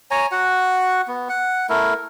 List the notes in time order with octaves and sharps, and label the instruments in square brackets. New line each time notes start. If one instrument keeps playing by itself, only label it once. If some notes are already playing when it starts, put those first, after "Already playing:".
[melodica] C#5 G#5 A#5
F#4 F#5
B3
F#5
A3 E4 A#4